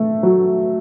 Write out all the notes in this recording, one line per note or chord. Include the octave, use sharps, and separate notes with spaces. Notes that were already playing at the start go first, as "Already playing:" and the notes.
Already playing: A3
F#3